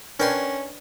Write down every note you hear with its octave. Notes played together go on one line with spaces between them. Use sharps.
C#4 D4 A#4 B4 C#5 G5 C6